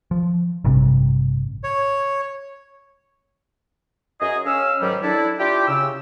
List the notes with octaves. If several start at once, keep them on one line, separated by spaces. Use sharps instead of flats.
F3
A1 G2 C3
C#5
F#2 G#4 D#5
C#4 F5 E6
G#2 D#3 F#3 G3
D4 E4 A4
D4 E4 F4 G4
C#3 E6